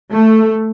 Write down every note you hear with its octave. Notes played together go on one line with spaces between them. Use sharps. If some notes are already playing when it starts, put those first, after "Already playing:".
A3